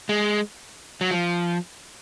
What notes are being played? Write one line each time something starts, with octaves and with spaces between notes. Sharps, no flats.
G#3
F#3
F3